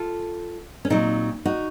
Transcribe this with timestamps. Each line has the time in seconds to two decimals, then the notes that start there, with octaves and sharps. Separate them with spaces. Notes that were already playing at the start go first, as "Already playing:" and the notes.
Already playing: F4 A4
0.85 C#4
0.90 A#2 F#3 C4 D#4
1.45 D#4 F#4